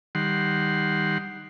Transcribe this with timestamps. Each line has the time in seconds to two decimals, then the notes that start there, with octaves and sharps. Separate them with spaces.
0.15 D#3 G3 F#5 C6